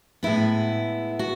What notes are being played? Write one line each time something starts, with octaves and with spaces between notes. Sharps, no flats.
A2 G#3 B3 E4
F#4